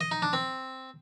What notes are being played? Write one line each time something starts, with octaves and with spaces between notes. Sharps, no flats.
D#5
D#4
D4
C4